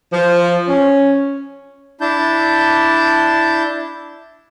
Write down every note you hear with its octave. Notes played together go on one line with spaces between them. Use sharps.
F3
C#4
D4 E4 A5 G6